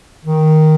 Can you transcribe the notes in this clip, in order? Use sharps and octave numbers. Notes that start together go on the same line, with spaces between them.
D#3